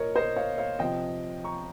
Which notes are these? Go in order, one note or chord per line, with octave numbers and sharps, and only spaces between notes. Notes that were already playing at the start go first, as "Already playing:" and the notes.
Already playing: A#2 A#4 C#5 D#5
C5 D#5
C#5 F5
C#5 F5
C3 F3 D#5 G5
A#5 C#6